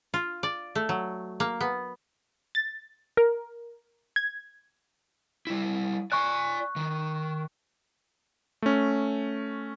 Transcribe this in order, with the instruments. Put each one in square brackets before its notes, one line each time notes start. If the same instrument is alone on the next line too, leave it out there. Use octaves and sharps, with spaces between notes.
[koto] F4
D5
A3
F#3
A#3
B3
[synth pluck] A6
A#4
G#6
[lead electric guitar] G3 E4
[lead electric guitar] D5 G#5 [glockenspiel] C#6 F#6
[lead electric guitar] D#3
[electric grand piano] A3 C#4